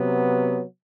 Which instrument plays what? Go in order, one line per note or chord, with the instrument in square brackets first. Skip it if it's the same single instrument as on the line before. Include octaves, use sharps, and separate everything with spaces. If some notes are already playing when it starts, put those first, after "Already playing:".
Already playing: [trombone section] C3 F#3 B3